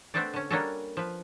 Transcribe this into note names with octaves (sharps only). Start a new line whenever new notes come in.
A3 B3 C4 D4 A4 D5
D3 C#4
G3 A#3 C#4 D4 F#4 A4
F3 B4